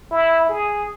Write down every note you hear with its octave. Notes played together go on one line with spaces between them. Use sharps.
E4
G#4